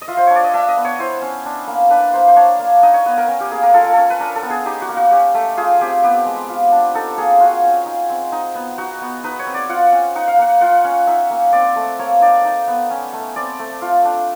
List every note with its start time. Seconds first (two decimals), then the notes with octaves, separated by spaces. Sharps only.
0.02 D#5
0.08 F4 E5
0.17 C5
0.27 D4 C#5
0.36 D5
0.44 D#5
0.54 D4 E5
0.68 D#5
0.77 B3
0.85 C#5
0.99 E4 C5
1.22 C#4
1.46 D4
1.67 A#3
1.90 D4 B4
2.13 A#3 C5
2.28 C5
2.36 D4 C#5
2.59 A#3
2.83 D#4 D#5
2.94 C#5
3.06 B3 B4
3.18 A#4
3.28 C#4
3.40 G4
3.51 A#3 G#4
3.63 A#4
3.74 F4 A4
3.84 A#4
3.93 C#4 A4
4.10 B4
4.20 D4 A#4
4.36 A4
4.43 B3
4.50 G#4
4.66 D#4 G4
4.82 F#4
4.89 A#3
4.97 F#4
5.11 C#4 G4
5.34 A3
5.57 F4 G#4
5.81 C4 G4
6.04 B3 G4
6.26 G#3
6.49 F4
6.72 D4
6.94 D#4 A4
7.18 A#3 G#4
7.40 F4 F#4
7.63 C#4
7.86 D#4
8.10 C4
8.32 D#4
8.55 B3
8.78 D#4 F#4
9.01 B3
9.24 D#4 B4
9.39 C#5
9.47 C4
9.54 D5
9.69 F4 F#5
9.92 C#4
10.15 D#4 F#5
10.28 F5
10.39 A#3 F#5
10.61 F4 F#5
10.84 C#4
11.07 D#4 E5
11.30 A#3
11.53 C4 D5
11.76 A3
11.99 A#3 C#5
12.21 D#4 D5
12.45 D#4
12.68 B3
12.90 C#4
13.13 A3
13.36 C4 D5
13.59 A3
13.82 F4
14.05 D4